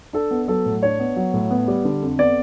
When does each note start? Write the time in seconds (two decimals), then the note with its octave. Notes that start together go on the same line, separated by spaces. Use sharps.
0.13 D4 A4
0.31 B3
0.48 F#3 A4
0.66 A2
0.83 D4 C#5
1.00 B3
1.16 F#3
1.34 A2
1.51 B3
1.68 G3
1.85 D3
2.02 F2
2.18 B3 D5